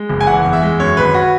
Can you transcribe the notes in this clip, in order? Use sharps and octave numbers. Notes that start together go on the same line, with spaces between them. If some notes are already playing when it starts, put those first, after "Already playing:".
Already playing: G#3
F#1
G#5
E3 F#5
E2
E5
G#3
F#2 C#5
G#1 B4
F#4